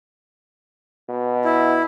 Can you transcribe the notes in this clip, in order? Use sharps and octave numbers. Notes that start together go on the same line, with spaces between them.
B2
E4